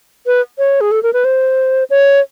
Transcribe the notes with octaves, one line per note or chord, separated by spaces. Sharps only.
B4
C#5
G#4
A4
A#4
B4
C5
C#5